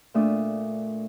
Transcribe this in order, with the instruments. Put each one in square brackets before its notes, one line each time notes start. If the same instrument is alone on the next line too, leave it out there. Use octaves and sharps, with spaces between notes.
[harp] A#2 A3 D4 E5 D#6